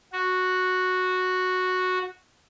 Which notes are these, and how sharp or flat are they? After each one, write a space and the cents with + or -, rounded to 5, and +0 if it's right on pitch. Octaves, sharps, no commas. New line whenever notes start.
F#4 -5